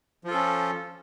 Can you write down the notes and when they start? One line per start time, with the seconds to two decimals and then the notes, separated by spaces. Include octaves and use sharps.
0.24 F3
0.27 F4
0.31 A4
0.34 C#4